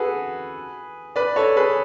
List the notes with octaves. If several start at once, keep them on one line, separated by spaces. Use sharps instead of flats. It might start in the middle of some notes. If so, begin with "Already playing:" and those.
Already playing: F#4 G#4 A4 B4
B4 D5
A4 C#5
G#4 B4